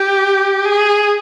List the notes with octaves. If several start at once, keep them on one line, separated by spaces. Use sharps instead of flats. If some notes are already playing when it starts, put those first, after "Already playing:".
Already playing: G4
G#4